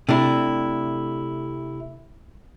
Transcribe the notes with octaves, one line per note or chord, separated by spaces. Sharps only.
C3 A3 D4 E4